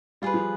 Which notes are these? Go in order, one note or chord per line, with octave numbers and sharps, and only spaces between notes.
G3 F4 G#4 B4
F3